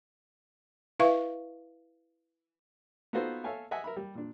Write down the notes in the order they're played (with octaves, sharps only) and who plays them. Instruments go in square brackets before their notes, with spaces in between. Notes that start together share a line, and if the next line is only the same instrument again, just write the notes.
[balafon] E4 B4 E5 F5 C#6
[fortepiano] B3 D#4 F4 F#4 A4 C5
A4 C#5 E5 F5 G#5 A5
D#5 E5 F#5 G#5
A#4 E5 B5
G3
A#2 D4